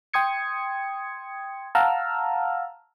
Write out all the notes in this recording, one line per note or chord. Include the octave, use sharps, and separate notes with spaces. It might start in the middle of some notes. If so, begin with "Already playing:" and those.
G5 C6 D#6 G#6 C#7
F5 F#5 A5 A#5 E6 F6